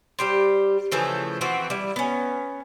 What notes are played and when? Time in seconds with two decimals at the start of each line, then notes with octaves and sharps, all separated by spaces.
0.19 G3 G4 C5
0.91 C#3 E3 F3 A3
1.41 E3 F3 C4 F#4
1.70 G3 E4
1.96 B3 C#4